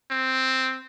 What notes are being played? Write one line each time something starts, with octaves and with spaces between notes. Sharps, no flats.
C4